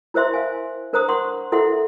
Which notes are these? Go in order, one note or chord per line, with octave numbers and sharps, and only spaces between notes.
E4 A#4 C5 E5 C6
F5 G#5
D4 A#4 C5 A#5 D#6
F#5 C6 C#6
E4 A4 A#4 E5 F#5 C6